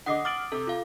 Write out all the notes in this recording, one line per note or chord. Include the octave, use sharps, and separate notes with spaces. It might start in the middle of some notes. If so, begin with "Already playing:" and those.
D3 D#5 F#5 D6 D#6 C7
D6 D#6 F6 A6 D7 F#7
C3 A4 D6
F4 F5